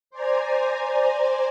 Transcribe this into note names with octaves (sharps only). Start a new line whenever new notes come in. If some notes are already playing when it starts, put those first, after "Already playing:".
C5 D5 G#5 A#5